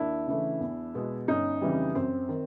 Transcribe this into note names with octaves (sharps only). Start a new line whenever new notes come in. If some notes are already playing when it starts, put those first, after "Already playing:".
Already playing: D#2 D4 E4
C#3 E3 A3
E2
B2 G#3 B3
G1 C#4 D#4
F2 C#3 E3 G3
F#2 C4
D#3